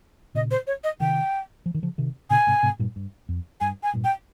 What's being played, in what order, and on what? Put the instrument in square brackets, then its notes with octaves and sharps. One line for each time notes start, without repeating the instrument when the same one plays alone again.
[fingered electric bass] A#2 C#3 [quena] D#5
[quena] C5
C#5
D#5
[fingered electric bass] C3 D#3 [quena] G5
[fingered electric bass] F3
D#3
C#3 F3
C3 D#3
[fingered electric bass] A#2 C#3 [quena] G#5
[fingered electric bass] G#2 C3
G#2 C3
G2 A#2
G2
F2
[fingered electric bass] G2 [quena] G#5
[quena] G#5
[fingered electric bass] G2 A#2
[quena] G5